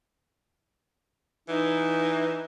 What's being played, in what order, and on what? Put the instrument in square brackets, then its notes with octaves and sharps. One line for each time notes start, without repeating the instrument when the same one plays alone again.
[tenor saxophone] E3 [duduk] D#4